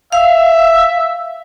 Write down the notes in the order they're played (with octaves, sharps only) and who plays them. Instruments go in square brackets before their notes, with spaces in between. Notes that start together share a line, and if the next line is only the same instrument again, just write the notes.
[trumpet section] E5 [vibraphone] F5